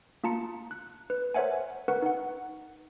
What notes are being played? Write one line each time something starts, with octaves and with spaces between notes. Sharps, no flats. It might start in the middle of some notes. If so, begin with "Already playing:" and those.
A#3 F4 A5 A#5 C#7
F#6
B4
A#4 C5 C#5 E5 F#5 G#5
A#4 B4 F#5 C#6
D#4 F#5